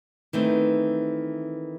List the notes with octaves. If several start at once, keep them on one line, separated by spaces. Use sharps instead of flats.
D#3 E3 A3 C4